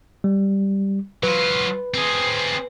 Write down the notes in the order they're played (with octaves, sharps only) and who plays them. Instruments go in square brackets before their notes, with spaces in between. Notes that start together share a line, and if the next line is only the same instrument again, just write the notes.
[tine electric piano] G3
[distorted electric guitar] F#3 F4 [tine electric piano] B4
[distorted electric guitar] C4 G#4